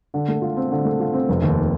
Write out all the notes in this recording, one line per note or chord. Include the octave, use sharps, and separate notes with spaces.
D3
A3
F4
C4
D3
A3
F4
C4
F1
D#2